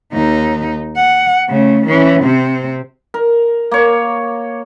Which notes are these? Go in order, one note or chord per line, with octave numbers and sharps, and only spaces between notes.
D#2 D#4
F#5
C#3 A3
E3 C#4
C3 C4
A#4
A#3 C#5